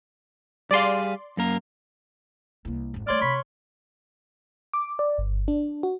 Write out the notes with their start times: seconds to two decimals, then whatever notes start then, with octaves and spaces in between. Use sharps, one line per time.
0.71 G3 G#4 D5 F5 C6
1.37 F#2 A#3 A#4
2.65 C2 A#3
2.94 G#1 F2
3.07 G3 A3 C#5 D5 C6 F6
3.21 C3 B5 C#6
4.74 D6
4.99 D5
5.18 G1
5.48 D4
5.83 F#4